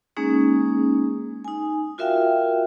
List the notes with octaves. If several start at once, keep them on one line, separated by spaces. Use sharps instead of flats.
G#3 A#3 C#4 D#4 G#4
D#4 G#5
F4 F#4 A#4 E5 F5 G5